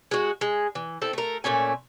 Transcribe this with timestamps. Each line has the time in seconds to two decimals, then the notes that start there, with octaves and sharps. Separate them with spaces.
0.11 G#3 F#4
0.41 G#3
0.75 E3
1.01 C4 E4 A4
1.13 A3 A#4
1.44 A#2 A3 C#4 G#5